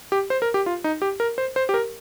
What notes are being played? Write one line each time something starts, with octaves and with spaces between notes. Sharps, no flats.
G4
C5
A#4
G4
F4
D#4
G4
A#4
C5
C5
G4
A#4